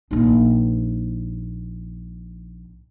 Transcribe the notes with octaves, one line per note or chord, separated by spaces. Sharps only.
A#1 D#4